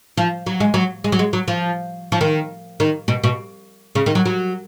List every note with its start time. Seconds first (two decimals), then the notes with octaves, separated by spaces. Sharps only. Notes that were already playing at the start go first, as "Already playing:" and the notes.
0.17 F3
0.46 F#3
0.60 G#3
0.74 F#3
1.04 G#3
1.12 F#3
1.19 G#3
1.33 F#3
1.48 F3
2.12 F3
2.21 D#3
2.80 D#3
3.08 B2
3.24 B2
3.95 C#3
4.06 D#3
4.15 F#3
4.26 F#3